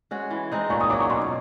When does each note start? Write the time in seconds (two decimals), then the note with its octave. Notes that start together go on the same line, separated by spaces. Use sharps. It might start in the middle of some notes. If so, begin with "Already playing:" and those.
0.11 G#3 C#4 F#4
0.31 E3
0.52 G#3 C4 D#4
0.70 A#2 C#6
0.81 D#6
0.90 F#3 A#3 C#4 D6
1.00 C#6
1.10 B2 C6